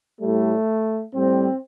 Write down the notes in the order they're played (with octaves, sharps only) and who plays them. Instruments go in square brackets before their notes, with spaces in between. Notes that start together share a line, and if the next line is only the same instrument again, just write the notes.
[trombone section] A2 G3 A3
A2 G3 C4